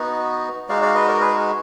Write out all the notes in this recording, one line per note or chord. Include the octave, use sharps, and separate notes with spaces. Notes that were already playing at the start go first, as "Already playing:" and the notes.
Already playing: B3 D#4 F#4
G#3 D#4 F#4 D5 F5
D5 F5
B4 D#5
A#4 D5
G#4 B4